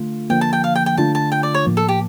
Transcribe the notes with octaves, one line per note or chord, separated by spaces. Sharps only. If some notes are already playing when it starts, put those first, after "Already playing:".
Already playing: D3 A3 F4
D3 F3 A#3 G5
A5
G5
F5
G5
G5
D3 A3 D4 F4 A5
A5
G5
D5
C#5
A2 F3 A#3
A4
G4